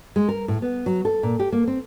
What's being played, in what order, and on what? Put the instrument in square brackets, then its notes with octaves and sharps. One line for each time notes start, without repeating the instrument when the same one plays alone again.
[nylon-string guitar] G#3
A#4
A2
B3
F#3
A4
A#2
G4
A#3
C4